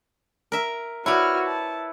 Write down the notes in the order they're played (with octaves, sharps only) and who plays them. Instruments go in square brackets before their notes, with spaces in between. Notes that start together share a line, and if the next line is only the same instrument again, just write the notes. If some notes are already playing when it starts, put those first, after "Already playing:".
[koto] A#4 E5
[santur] E4 B4 [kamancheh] F#4 F6 [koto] C#5 D5
[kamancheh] A5